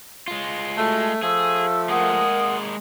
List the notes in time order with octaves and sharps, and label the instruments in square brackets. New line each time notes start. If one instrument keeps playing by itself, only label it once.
[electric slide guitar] G#3 F4
[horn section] A3 [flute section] F#4 A5
[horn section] F3 A3 [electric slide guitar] G#4 [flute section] E6
[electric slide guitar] G#3 A#3 G#4 [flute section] A#4 F#5 D#6